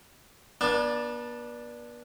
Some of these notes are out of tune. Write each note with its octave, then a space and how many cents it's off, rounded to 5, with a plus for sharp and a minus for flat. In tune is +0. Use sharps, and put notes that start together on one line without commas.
B3 -40 D4 +0